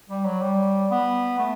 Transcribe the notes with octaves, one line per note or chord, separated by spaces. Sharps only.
G3
F#3
G3
B3
A3